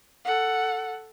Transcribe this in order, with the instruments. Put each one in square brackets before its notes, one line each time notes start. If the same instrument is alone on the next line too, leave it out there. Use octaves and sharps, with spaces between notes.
[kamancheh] A4 F#5